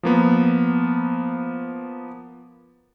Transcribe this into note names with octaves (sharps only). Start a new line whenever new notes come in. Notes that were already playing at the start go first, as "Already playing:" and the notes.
F3 A#3 B3